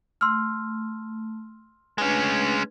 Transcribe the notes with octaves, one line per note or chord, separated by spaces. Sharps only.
A3 C6 E6 F6
G#3 A3 C#4 D4 B4